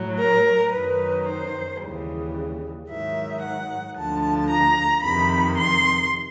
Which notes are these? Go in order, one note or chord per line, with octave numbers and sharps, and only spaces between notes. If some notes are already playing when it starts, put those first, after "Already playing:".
Already playing: A2 F#3
A#4
F#2 D#3 F#3 B4
C5
D#2 C#3 E3 G3
G#2 D#3 F#3 E5
F#5
D2 D3 F3 A5
A#5
F2 C3 D#3 B5
C6